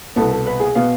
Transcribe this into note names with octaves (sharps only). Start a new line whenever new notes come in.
C2 B2 B3 A4
A4
B4
G#4
B2 B3 F5